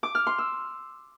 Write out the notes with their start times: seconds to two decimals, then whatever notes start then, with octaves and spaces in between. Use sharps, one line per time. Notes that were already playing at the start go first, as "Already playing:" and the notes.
0.03 D6
0.15 F6
0.27 C6
0.38 E6